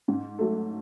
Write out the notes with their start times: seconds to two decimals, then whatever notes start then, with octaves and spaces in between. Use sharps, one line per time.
0.08 G#2
0.39 F#3 A3